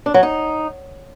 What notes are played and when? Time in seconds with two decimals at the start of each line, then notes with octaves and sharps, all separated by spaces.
0.06 D4
0.14 F#3
0.23 D#4